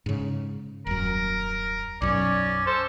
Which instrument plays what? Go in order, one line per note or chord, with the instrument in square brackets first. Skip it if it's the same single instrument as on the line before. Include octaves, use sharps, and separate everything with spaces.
[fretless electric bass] G#2 C#3
[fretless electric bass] D#1 F#2 [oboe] A#4
[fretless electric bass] B1 F#2 [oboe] C#4 [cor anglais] D5
[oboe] A4 [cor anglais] C5